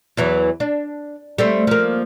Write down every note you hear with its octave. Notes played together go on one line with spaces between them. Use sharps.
E2 E3 F#3
D4
G3 A3 C4
F3 A#3